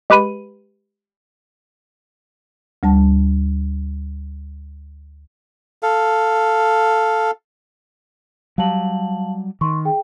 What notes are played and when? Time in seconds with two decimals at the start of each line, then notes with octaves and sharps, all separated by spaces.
0.10 G#3 G4 B4 B5 D#7
2.83 D2 G3 A5
5.83 A4 F5
8.58 F#3 G3 F5 A5 F#7
9.61 D#3 C6 C#6
9.85 G#4 G5